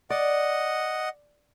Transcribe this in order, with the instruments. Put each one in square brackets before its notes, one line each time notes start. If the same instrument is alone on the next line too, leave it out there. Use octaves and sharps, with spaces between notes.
[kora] D5 [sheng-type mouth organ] D#5 F#5